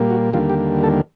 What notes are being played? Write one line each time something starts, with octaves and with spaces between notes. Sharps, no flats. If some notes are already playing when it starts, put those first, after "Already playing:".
Already playing: A#2 G3 A#3
F#4
D#2 D3 G3 A#3 F4
G4
A4